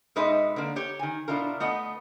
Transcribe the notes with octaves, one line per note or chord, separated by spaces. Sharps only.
B2 G#3 D#4 B4 D#5 E5
D3 A#3
G4 C#5
D#3 G#5
B2 D4 E4 F4 A#4
A3 B3 D#5